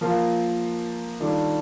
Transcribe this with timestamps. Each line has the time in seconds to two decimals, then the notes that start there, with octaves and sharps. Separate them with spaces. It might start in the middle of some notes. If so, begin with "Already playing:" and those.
0.01 F3 A#3 F4 A#4
1.20 D#3 G3 D4 F4 A4